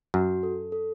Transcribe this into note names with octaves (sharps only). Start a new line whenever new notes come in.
F#2 F#4
A4
A4